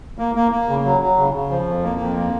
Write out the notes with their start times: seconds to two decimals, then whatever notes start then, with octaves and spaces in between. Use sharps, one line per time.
0.18 A#3
0.35 A#3
0.52 A#3
0.69 C#3
0.84 F#3
1.01 F#3
1.18 C#3
1.34 C#3
1.50 F3
1.67 F2
1.83 A#3
2.00 F2
2.16 A#3